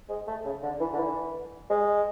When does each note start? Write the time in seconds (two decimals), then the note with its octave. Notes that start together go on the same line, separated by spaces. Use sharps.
0.09 G#3
0.27 A3
0.45 C#3
0.63 D3
0.80 E3
0.93 D3
0.98 E3
1.70 G#3